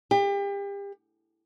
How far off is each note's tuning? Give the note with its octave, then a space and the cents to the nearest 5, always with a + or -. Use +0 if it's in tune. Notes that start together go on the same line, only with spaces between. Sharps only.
G4 +35